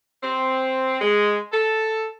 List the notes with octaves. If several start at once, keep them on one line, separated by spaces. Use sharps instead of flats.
C4
G#3
A4